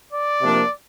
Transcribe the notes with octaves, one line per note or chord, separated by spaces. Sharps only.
D5
C3 F3 A#3 D4